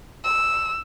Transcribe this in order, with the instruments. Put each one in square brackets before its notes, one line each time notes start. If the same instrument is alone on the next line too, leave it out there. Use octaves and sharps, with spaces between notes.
[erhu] E6